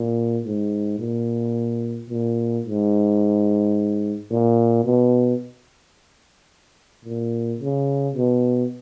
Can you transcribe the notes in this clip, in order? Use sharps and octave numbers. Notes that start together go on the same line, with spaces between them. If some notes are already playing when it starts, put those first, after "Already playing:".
Already playing: A#2
G#2
A#2
A#2
G#2
A#2
B2
A#2
C#3
B2